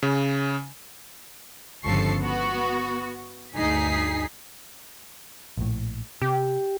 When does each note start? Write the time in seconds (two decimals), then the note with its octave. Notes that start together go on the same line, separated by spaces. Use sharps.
0.03 C#3
1.85 G1 C#2 F3 A4 C#6 C7
2.21 B3 F#4
3.56 D2 G2 D#4 G#4 B6 C7
5.57 A#1 A2
6.22 C3 G4